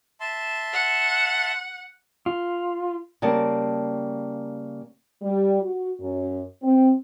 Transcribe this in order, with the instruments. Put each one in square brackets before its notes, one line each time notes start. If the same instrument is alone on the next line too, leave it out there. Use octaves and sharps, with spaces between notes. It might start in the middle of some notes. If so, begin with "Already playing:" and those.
[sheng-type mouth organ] E5 A5 C6
[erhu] F#5
[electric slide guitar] F4
[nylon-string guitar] C#3 G3 A#3 A5
[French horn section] G3
F#4
F#2
C4